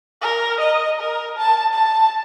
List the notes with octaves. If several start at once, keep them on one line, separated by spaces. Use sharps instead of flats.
A#4
D#5
A#4
A5
A5